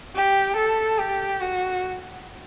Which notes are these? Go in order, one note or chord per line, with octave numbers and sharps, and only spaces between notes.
G4
A4
G4
F#4